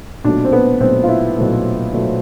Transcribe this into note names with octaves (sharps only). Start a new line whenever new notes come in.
B1 A#2 F#3 A3 D4
C4
B3
B1 A#2 F#3 A3 C4
F4
E4
B1 A#2 F#3 A3
B1 A#2 F#3 A3